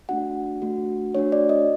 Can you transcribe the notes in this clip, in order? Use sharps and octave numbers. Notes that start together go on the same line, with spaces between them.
A3 D4 F#4 F#5
A3 D4 F#4
A3 D4 F#4 C#5
D5
D#5